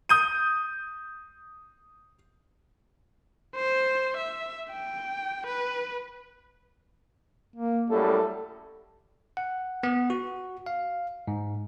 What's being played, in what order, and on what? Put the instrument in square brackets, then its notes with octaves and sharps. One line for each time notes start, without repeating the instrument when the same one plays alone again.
[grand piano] D#6 G6 D#7
[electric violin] C5
E5
G5
B4
[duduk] A#3
[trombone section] F#2 A2 G3 [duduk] A4
[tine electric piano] F#5
B3
F#4
F5
G#2